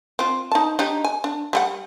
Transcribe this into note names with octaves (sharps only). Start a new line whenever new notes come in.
C4 F4
D#4 A5
D4 D#4 G4
G#5
D4
G3 G4 F#5